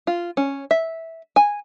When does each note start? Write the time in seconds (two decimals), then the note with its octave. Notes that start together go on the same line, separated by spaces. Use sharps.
0.07 F4
0.37 C#4
0.71 E5
1.36 G#5